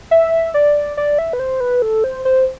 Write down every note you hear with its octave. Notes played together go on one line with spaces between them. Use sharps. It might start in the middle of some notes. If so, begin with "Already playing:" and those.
E5
D5
D5
E5
B4
C5
B4
A4
C5
C5